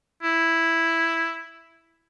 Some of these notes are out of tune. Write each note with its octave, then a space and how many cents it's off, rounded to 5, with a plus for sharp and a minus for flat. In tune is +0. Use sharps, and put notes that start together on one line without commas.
E4 +0